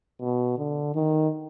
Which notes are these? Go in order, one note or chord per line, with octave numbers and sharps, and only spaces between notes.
B2
D3
D#3